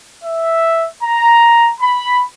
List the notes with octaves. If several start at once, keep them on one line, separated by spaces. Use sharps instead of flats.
E5
A#5
B5